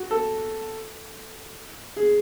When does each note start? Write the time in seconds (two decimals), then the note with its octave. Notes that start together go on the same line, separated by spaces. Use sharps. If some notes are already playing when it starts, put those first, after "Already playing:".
Already playing: F#4
0.11 A4
1.97 G#4